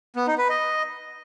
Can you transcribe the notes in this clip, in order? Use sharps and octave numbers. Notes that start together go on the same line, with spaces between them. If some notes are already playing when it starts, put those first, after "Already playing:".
B3
D#4
B4
D#5